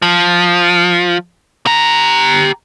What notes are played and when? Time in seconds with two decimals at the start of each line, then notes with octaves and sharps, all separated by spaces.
0.02 F3
1.66 G4 A#5